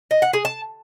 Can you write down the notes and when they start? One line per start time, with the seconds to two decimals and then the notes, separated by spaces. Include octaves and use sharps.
0.11 D#5
0.22 F#5
0.33 G#4
0.45 A5